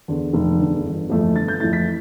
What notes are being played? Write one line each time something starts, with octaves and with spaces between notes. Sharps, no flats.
E2 D3
F1
E2 D3
G1
F2 E3 A3 E4
G1 A6
G6
F2 E3 A3 E4 A6
B6